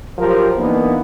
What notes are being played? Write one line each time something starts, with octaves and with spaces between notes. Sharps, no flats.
F3 F#3 G4 A#4 C5
E3 A#3 B3 D4 D#4